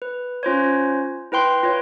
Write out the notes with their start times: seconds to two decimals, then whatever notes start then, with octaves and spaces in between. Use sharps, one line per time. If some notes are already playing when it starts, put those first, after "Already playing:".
0.02 B4
0.43 C#4 F4 C5 C#5
1.32 E4 B4 G5 C6
1.63 F4 B4 C#5